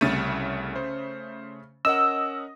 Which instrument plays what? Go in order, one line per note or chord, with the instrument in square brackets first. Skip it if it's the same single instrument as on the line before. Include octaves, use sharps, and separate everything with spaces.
[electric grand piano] C2 A6 D#7 [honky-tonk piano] C#3 A3
[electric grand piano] C5
[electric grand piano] C#4 A#4 F#5 [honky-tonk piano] D#5 [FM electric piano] E6